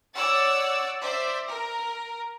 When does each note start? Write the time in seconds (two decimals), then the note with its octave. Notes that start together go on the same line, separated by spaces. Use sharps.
0.15 C#5 D5 F#5 E6 A6
1.01 C5 D5 E5
1.46 A#4